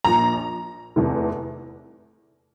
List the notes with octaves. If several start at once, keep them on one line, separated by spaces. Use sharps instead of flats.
A#1 A#2 F3 A#5
F1 E2 C3 E3